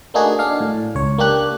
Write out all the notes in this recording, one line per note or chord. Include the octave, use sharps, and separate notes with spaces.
A3 A#3 D4 D#4 F#4 G#4
D4 F5
A2
C#2 C#5
A#3 D4 G4 F#6